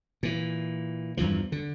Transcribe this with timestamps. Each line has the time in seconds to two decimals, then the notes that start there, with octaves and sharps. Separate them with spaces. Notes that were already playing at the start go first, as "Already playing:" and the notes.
0.23 A#2 E3
1.17 E2 G2 E3 F3
1.52 D3